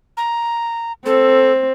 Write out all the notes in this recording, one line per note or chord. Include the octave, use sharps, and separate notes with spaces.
A#5
C4 A4